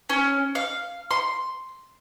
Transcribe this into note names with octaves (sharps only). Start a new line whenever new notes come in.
C#4
F5
C6